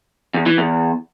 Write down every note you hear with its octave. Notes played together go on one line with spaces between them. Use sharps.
E2
E3
E2